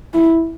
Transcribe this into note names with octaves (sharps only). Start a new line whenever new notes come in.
E4